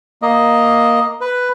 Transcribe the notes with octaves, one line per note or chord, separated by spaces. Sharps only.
A#3 D#5
B4